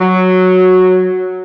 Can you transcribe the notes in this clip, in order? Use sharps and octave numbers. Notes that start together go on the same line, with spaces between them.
F#3